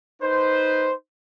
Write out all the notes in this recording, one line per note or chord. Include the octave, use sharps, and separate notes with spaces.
D#4 B4 C5